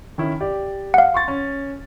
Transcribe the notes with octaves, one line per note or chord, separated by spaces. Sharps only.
D#3 C#4 E4
G4 D5
F5 F#5
C6 C#6 A6
C#4